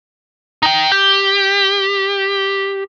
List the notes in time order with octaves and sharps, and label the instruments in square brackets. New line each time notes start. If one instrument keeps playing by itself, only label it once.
[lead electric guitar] D#4 G5
G4